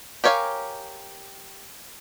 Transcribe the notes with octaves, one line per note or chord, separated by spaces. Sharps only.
G4 A#4 C#5 F5 G#5